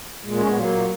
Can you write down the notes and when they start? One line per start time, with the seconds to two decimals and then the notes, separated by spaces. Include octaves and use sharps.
0.24 A#2 G#3
0.39 C#4
0.45 A#2 B3
0.56 F#3 A#3
0.67 A#2